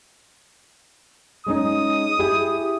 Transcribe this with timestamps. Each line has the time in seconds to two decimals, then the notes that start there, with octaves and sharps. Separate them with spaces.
1.46 G#3 C#4 D#4 D#6
2.19 E4 G4 G#4